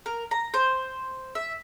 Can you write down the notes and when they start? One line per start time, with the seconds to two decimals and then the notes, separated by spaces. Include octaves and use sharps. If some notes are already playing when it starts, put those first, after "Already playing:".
0.06 A#4
0.31 A#5
0.54 C5
1.35 E5